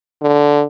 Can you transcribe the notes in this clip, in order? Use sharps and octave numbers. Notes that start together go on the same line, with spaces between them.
D3